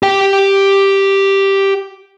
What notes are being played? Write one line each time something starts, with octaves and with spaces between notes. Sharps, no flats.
G4 G5